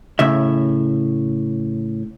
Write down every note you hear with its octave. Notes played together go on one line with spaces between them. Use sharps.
A2 C#3 E5